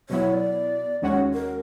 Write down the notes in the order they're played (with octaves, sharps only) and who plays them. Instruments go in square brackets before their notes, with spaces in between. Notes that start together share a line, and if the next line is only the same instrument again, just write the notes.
[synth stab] B2 F#3 B3 E4 [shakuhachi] C#5
[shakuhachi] D5
[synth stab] D#2 D#3 G#3 C#4 F#4 [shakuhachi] C#5
[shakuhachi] A#4